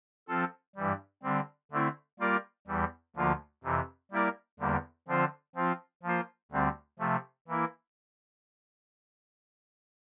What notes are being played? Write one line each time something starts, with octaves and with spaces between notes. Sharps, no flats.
F3 C4 F4 A4
G2 E3 G3
D3 G3 C4
D3 A3 C4 E4
G3 A#3 F4 A#4 D5
E2 E3 G3
D2 D3 F3 A#3 F4
F2 C3 E3
G3 A#3 E4 A#4 D5
E2 D3 G3 A#3
D3 F3 C4 F4 C5
F3 C4 F4
F3 A#3 F4 C5
D2 D3 G3 C4
C3 F3 A3
E3 A#3 E4